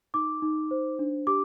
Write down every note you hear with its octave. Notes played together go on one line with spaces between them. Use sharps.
D#4 D6
D#4
C5
D4
G4 D6